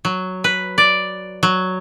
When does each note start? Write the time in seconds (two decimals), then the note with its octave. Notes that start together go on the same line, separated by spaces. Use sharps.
0.05 F#3
0.44 B4
0.78 D5
1.43 F#3